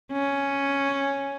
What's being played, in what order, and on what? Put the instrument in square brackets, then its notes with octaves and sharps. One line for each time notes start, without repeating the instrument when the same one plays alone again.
[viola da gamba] C#4